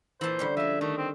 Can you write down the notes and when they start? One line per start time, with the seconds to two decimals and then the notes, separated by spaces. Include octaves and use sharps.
0.21 A#2 E3 C5 A5 B5
0.39 D3 G3 C#4
0.57 F3 G#3 E5
0.81 D#3 A3
0.98 C4